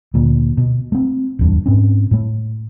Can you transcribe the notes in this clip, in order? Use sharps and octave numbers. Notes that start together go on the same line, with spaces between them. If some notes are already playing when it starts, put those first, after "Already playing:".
D2 A#2
B2
A3 C4
D1 E2 G2
G#2 C4 C#4
A2 A3